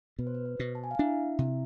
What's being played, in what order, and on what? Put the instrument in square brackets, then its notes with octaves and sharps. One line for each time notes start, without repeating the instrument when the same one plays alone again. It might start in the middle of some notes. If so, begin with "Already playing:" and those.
[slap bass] B2 [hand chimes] B4
[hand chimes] C5
B4
C5
[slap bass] B2
[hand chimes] A5
G#5
F5
[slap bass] D4 [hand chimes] E4 E5
[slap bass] C3